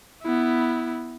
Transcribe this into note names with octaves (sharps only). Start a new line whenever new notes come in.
B3 E4